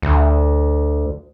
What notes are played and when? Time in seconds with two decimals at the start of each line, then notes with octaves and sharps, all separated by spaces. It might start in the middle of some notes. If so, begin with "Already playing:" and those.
0.02 D2